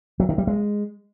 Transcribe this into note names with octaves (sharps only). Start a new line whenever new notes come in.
F#3
D#3
G3
G#3